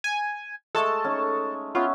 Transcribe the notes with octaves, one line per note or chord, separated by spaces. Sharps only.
G#5
G#3 A3 A4 A5
C#4 D#4
B3 C#4 F4 E5